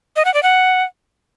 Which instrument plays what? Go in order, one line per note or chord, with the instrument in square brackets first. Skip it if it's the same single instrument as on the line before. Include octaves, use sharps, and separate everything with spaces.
[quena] D#5
F#5
D5
F#5